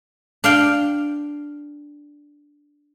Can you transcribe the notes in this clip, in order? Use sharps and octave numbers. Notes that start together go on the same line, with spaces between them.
D4 F5 G5